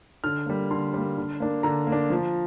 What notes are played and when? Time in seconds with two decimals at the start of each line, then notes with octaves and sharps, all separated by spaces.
0.24 D3 F6
0.46 G3 A#3
0.71 D3 C6
0.94 G3 A#3
1.17 D3
1.40 A#3 D4
1.63 D3 A#5
1.87 A#3
1.92 D4
2.10 F3